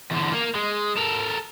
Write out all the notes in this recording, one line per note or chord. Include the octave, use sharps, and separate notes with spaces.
E2 D3
A#3 A#4
G#3
A4 A#4